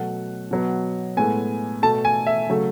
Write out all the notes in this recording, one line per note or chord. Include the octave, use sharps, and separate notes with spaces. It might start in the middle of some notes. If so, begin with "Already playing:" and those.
Already playing: B2 F#3 A3 F#5
B2 F#3 B3
A2 G#3 B3 G#5
B2 A3 A5
G#5
E5
C#3 F#3 A3